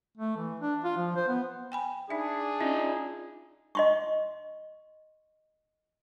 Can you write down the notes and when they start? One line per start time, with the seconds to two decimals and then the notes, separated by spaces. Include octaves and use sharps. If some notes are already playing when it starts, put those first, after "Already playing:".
0.18 A3
0.37 E3
0.60 D4
0.84 F4
0.97 F3
1.16 C5
1.28 B3
1.72 G5 G#5 B5
2.10 D4 D#4 G#4 E5
2.61 C#4 D#4 F4 D#5
3.75 D#5 C6 C#6